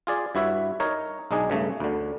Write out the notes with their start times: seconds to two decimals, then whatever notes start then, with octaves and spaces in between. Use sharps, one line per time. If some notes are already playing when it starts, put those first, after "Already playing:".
0.07 F4 G#4 D5
0.35 G2 E4 F#4 C#5 E5
0.80 D#4 A#4 C#5
1.31 B1 G#3 D4 D#4 G#4
1.50 G2 C#3 A3
1.80 D2 D3